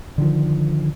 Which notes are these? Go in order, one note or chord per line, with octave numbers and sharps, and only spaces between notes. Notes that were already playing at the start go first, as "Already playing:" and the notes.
D3 D#3 F3